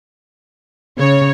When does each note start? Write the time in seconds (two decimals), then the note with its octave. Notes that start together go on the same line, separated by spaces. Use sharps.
0.98 C#3 C#5